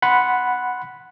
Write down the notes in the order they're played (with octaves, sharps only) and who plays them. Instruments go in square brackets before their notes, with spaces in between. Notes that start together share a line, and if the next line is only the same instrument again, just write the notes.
[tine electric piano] F#5 B5 C6